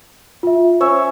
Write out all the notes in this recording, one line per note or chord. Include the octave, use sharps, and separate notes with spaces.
F4 E5
C#4 C5 C#5 E5